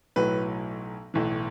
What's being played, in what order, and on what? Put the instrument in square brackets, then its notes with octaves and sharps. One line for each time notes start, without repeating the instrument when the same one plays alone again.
[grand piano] B1 A2 F#3 B4
B1 A2 E3